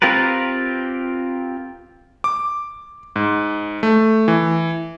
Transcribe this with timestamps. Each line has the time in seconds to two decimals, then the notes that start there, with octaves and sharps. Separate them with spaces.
0.02 C4 F4 G4 A#4 B4
2.24 D6
3.16 G#2
3.83 A3
4.28 E3